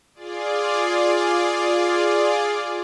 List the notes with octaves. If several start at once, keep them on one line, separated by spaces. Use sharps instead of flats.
F4 G#4 D5